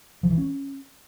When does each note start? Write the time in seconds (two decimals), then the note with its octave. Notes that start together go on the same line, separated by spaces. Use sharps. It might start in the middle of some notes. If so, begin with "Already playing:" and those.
0.23 F3
0.31 E3
0.38 C#4